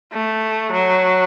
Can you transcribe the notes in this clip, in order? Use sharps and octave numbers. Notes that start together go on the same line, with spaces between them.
A3
F#3